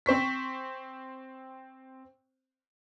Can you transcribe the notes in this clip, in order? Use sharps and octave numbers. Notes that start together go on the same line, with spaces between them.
C4 C5 C#6 B6